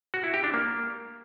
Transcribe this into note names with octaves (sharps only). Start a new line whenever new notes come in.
F#4
E4
G4
D4
A#3